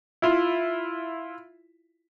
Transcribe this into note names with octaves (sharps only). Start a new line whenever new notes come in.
E4 F4